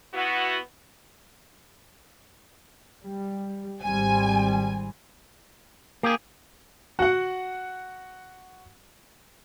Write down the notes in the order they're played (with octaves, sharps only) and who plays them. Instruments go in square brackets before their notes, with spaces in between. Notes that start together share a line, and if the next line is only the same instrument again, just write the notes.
[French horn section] B3 E4 F#4
[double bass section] G3
[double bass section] G#1 G3 C4 [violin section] G#5
[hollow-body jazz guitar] A#3 [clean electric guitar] G4 G#4
[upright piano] F#4 F#5